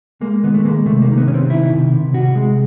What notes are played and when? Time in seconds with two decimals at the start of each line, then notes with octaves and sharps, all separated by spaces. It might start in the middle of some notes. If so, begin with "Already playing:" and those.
0.21 G#3 A#3
0.44 D#3 B3
0.54 A3
0.65 G#3 A#3
0.86 C3 A3
1.02 A#3
1.08 D#3
1.18 B3
1.28 C3 C#4
1.34 C4
1.50 D#3 E4
1.72 C3
1.93 C3
2.14 C3 F#4
2.35 G#3